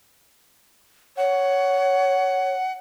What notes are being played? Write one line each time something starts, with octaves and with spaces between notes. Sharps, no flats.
C#5 F#5